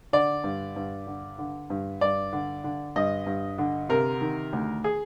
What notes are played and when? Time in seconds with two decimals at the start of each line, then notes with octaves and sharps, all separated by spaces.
0.13 D3 D5
0.44 G2
0.76 G2
1.07 D3
1.38 D3
1.70 G2
2.01 G2 D5
2.33 D3
2.64 D3
2.96 G2 D#5
3.27 G2
3.58 D3
3.89 C3 A#4
4.21 D#3
4.53 D2
4.84 G#4